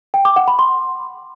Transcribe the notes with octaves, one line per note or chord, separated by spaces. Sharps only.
G5
D6
F#5
B5
C6